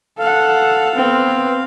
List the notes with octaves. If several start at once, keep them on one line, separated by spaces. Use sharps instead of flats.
A4 F5 F#5
B3 C4